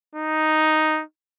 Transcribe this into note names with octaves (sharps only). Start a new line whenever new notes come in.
D#4